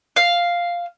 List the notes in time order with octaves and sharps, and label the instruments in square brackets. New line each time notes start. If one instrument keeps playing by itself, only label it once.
[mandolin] F5